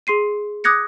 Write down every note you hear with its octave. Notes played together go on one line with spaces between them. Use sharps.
G#4 C6 C7 D#7
D6 D#6 F#6 G#6 A#6 C#7